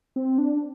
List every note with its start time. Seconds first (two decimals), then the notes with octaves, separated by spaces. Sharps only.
0.16 C4
0.38 D4